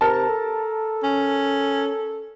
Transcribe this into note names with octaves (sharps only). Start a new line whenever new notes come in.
C3 A#4 A5
A4
C#4